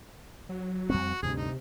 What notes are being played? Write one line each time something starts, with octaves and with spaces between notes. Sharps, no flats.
F#3
F2 G3 C4 F#4
D2 G2 C3 G#4
D#4